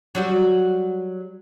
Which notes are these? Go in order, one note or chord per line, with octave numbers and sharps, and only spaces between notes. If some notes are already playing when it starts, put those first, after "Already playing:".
F#3 G3 F#4